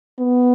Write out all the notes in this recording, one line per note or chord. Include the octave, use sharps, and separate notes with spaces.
B3